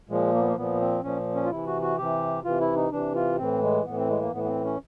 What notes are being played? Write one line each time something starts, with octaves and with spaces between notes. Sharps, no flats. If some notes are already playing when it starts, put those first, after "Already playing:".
A#2 F3 G#3
A#3
B3
A#3
A#2 F3 B3
C4
A#2 F3 C#4
C#4
F4
C3 E3 E4
F#4
F#4
C3 E3 G4
C3 E3 F4
E4
D#4
C3 E3 D4
F4
A2 E3 C4
G#3
A2 E3 B3
C4
G#3
A#3
A2 E3 B3
B3
C4
C#4